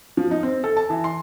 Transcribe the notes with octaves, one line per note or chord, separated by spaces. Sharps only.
F3
D#4
C4
A4
A5
E3
C6